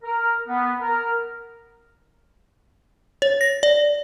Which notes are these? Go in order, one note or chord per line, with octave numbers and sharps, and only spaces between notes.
A#4
B3
A#4
C#5
A#6
D5